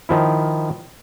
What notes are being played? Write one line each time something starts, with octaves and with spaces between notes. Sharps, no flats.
D#3 F3 E4